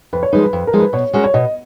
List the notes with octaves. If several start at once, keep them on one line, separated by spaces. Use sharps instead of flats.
F2 B4
C#5
F3 G#3 D#4 B4
B4
F2
A#4
F3 G#3 D#4
B4
B2 C#5
G#3 C#4 F#4 A#4
C#5
B2 D#5